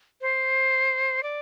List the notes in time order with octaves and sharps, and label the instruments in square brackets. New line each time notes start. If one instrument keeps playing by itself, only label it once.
[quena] C5
D5